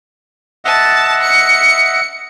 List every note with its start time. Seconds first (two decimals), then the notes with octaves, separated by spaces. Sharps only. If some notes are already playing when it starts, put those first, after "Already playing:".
0.65 D#5 E5 F#5 A5
1.22 C#7